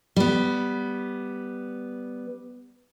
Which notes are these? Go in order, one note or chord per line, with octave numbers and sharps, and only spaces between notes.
G3 B3